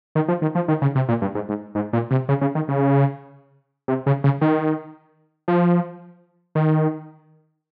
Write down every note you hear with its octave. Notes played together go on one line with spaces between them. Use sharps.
D#3
F3
D#3
F3
D#3
C#3
C3
A#2
G2
G#2
G#2
G#2
A#2
C3
C#3
C#3
D#3
C#3
C3
C#3
C#3
D#3
F3
D#3